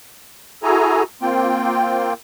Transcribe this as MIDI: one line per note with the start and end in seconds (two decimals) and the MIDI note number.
0.63 1.03 64
0.63 1.03 66
0.63 1.03 68
0.63 1.03 69
0.63 1.03 80
0.63 1.03 82
1.22 2.13 58
1.22 2.13 60
1.22 2.13 65
1.22 2.13 79